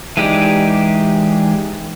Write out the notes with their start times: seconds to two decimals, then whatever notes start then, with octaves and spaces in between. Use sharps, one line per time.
0.17 E3 G#3 D#4 G4 D5